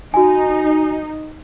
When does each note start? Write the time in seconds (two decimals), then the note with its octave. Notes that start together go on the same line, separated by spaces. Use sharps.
0.14 D#4 F#4 G#5